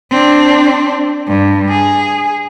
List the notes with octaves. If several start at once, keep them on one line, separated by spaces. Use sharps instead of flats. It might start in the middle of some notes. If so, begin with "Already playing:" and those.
C4 D4
G2
G#4